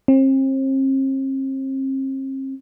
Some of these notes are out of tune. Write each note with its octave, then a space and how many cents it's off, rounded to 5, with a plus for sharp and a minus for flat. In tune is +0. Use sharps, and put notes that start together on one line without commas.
C4 +40